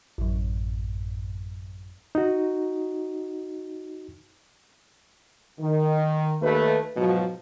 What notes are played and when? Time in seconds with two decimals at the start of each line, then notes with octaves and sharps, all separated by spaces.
0.18 A1 F#2
2.15 D#4 F#4
5.60 D#3
6.42 D#2 A3 B4
6.97 G#2 B2 F3 F#3